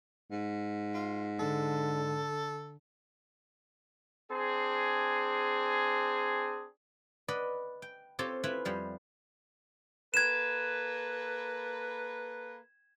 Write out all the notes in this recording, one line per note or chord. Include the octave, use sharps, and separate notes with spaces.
G#2
F4
D3 A4
C4 D4 G#4
B4 D5 D#5 F#5
G5
C4 F4 G4 A4 C#5 A5
E4 F4 B4 G#5 B5
F2 G3 F5
A#3 A4 B4 G#6 E7